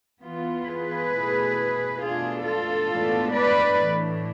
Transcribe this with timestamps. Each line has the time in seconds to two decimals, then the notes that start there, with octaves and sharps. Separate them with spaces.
0.22 E3 B3 F4
0.67 G#4 B4
1.11 B2 A3 E4
2.00 B2 A3 D4 F4 G#4
2.45 F4 A4
2.89 A2 E3 G#3 B3 D4
3.33 B4 D5
3.78 A2 E3 A3 D4